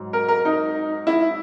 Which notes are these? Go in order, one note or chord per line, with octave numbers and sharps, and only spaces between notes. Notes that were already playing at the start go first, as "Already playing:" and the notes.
Already playing: G#2 F#3
A#4
A#4
D#4
E4